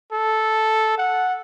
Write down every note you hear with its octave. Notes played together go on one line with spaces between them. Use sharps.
A4
F#5